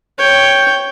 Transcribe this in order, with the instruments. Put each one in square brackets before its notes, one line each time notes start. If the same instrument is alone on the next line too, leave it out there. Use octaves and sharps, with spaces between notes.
[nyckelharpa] C#5 G5